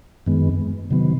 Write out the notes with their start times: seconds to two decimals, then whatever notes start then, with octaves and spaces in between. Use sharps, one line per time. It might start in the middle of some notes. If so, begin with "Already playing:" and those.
0.26 F#2 D#3 G#3 B3
0.91 C3 D#3 F#3 B3